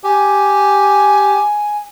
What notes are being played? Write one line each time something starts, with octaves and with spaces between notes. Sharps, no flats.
G4 G#5